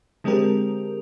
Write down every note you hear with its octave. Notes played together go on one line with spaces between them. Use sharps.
D3 G#3 C4 G4 A#4